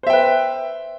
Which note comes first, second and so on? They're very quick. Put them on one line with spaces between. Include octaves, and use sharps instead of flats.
C5 E5 G5 B4